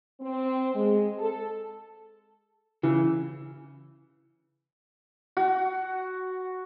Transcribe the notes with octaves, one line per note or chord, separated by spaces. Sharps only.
C4
G#3
A4
C#3 E3
F#4